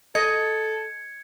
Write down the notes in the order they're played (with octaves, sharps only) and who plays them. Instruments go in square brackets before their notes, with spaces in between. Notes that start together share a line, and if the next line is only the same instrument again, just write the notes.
[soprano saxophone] A4 [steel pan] D#5 [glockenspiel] G#6 C#7